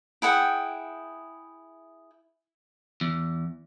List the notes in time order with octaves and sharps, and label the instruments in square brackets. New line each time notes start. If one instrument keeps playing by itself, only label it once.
[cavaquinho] E4 G#4 F#5 G5
[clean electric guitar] E2